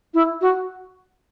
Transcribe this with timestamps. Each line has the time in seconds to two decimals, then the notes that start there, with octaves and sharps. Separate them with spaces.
0.14 E4
0.41 F#4